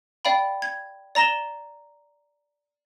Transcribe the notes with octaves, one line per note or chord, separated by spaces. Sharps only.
D5 F5 G5 B5
G#6
D5 A#5 A#6 E7 G7